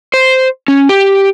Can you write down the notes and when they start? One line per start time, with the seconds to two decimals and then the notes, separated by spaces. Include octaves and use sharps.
0.14 C5
0.68 C#4
0.89 G4